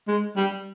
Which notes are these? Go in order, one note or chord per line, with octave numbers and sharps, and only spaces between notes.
G#3
G3